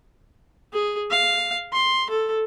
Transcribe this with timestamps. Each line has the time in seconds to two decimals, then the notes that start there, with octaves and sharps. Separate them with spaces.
0.73 G#4
1.11 F5
1.73 C6
2.10 A4